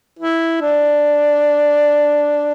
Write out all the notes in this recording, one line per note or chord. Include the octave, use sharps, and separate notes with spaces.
E4
D4